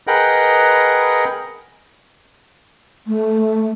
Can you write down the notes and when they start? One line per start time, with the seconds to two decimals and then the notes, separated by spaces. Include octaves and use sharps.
0.07 G#4 A#4 B4 D#5 F#5 G5
3.07 A3